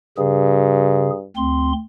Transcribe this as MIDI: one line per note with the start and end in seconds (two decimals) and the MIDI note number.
0.18 1.27 43
0.18 1.10 49
0.18 1.10 68
1.36 1.73 38
1.36 1.73 60
1.36 1.73 84